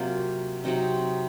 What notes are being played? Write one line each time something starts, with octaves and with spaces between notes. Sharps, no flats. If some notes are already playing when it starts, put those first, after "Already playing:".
Already playing: C3 F#3 A#3 F4
C3 F#3 C4 D#4